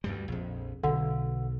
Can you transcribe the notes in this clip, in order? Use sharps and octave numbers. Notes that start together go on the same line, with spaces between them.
D2 G2 G3
A#1 F2
B1 D3